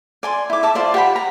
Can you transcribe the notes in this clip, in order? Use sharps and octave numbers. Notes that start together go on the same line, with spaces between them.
D5 G#5 C6
E4 D6
E5 A5 D6
F4 C5 D5
G4 F#5 G5 B5
A#5